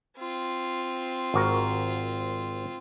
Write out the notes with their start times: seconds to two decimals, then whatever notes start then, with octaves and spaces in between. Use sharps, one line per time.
0.18 C4 F4
1.34 G#1 F#4 A#4